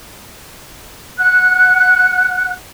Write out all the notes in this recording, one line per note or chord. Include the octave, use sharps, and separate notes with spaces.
F#5 F#6